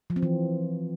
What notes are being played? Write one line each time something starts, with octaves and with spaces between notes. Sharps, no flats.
F3
C4
E3